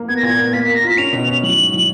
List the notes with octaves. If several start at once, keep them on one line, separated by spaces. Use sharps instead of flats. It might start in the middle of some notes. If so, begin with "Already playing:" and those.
Already playing: A#3
B3 G#6
A#6
A#2 G#6
B3
A#3 B6
A#3 B6
A#6
F4 B6
C#4 F7
B2
C#4
F#3 F#7
G#2
F#3 F#7